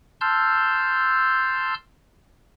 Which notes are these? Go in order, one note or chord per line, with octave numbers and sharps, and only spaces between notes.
A5 C6 E6 F6 G6